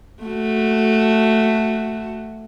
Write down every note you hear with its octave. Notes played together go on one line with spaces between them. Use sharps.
A3 F#4